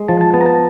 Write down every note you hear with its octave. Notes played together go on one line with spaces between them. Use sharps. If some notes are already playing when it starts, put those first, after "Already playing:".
Already playing: G#3
F3 A5
A5
B3 A5
A#5
A5